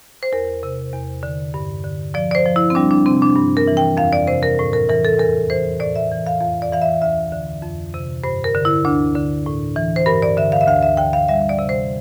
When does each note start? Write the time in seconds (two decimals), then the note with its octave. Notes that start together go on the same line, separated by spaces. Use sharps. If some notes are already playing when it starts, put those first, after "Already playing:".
0.23 C5
0.32 E2 A#4
0.63 C3
0.93 E2
1.23 D3
1.54 G2
1.84 D3
2.14 F3 D5
2.31 D5
2.35 C5
2.46 F3
2.56 E4
2.70 C4
2.75 G3 D4
2.91 D4
3.06 C3 C4
3.22 D4
3.36 G2
3.57 A#4
3.68 E3
3.77 G5
3.97 F2 F5
4.13 D5
4.28 C3 C5
4.43 A#4
4.59 A2
4.73 A#4
4.89 E3 A#4
5.05 A4
5.19 E2 A#4
5.50 E3 C5
5.80 A2 D5
5.96 E5
6.11 E3
6.27 F5
6.41 F2 F5
6.62 D5
6.72 E3 F5
6.82 E5
7.01 D2 E5
7.32 D3
7.62 F2
7.94 C3
8.24 G2 C5
8.44 A#4
8.55 D3
8.65 E4
8.85 D2 D4
9.15 D3
9.46 A2
9.76 E3
9.96 C5
10.06 G2 A#4
10.22 D5
10.37 D3 E5
10.52 F5
10.61 E5
10.67 D2 F5
10.83 E5
10.97 D3 G5
11.13 F5
11.28 G3 E5
11.49 D5
11.59 C3
11.69 C5